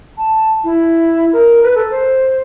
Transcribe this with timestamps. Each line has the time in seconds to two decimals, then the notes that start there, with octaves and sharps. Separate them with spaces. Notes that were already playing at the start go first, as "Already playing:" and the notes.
0.18 A5
0.64 E4
1.33 A#4
1.63 B4
1.75 A4
1.91 C5